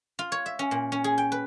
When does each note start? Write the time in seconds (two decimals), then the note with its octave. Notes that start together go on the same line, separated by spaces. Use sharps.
0.19 F4
0.32 C#5
0.46 E5
0.59 C#4
0.71 A#2
0.92 C#4
1.04 G#4
1.18 G5
1.32 B4